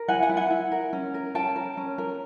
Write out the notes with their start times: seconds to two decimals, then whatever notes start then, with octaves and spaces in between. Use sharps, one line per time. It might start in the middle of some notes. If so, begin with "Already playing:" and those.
Already playing: A#4
0.08 E4 F#5 G#5
0.23 F#5 G#5
0.29 E4
0.37 F#5 G#5
0.51 E4
0.72 A#4
0.93 C#4
1.14 A#4
1.34 C#4 G5 A5
1.56 A#4
1.77 C#4
1.98 A#4